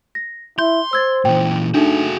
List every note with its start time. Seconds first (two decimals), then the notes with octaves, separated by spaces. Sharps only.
0.15 A#6
0.59 E4 C6 G6
0.93 C5 E6 G#6 A6
1.25 A#2 E3 G5
1.74 A3 D4 D#4 F#4 G#4